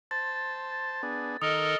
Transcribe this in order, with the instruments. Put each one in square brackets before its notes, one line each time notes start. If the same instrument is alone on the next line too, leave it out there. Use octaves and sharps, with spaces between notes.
[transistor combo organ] C5 A5 [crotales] A6
[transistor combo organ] B3 D4 G#4
[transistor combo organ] D#3 [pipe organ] A4 A#4 D#5 [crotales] D#6